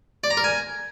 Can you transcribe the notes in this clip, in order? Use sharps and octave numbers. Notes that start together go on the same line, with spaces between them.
D5
A#5
A#4
G#5